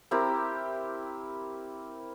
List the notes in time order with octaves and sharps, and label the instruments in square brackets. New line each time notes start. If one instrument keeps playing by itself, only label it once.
[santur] C4 E4 G4 A#4